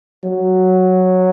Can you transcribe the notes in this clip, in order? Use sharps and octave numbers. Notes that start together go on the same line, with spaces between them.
F#3